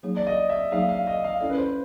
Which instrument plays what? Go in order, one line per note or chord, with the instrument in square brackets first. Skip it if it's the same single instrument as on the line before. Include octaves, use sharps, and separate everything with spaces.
[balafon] F#3 A#3 D#4 G#4 C#5
[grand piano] D5
D#5
E5
[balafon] F#3 A#3 D#4 G#4 C#5 [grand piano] F5
[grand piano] F5
D#5
F5
[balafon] C#4 E4 A4 D5
[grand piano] B4
C5